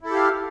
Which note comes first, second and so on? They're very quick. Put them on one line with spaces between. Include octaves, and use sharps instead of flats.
E4 A4 G4 F5